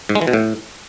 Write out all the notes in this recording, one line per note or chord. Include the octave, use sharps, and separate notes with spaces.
G#2
G#3
E3
B2
A2